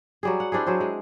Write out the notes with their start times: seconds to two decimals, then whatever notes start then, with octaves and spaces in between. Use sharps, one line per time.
0.23 F#3 G3 G#4
0.40 F#5
0.52 C4 D4 E4 G#4
0.66 F#3 G#4 C5
0.80 G#3